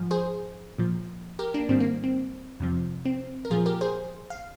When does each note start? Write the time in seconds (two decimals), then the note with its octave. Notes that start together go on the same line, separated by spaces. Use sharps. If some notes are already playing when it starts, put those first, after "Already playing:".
Already playing: G#2 F3
0.11 G#4 C5
0.78 A#2 F3
1.39 G4 A#4
1.54 A#3 D4
1.69 G#2 D#3 G3 C4
1.80 A#3
2.04 C4
2.60 F2 C3 F3
3.05 C4
3.45 A#4
3.50 A#2 F3 F4 G#4
3.66 G4 A#4
3.81 G#4 C5
4.30 F5